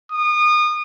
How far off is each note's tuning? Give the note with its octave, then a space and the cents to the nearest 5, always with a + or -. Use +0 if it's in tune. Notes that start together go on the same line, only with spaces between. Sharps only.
D#6 -30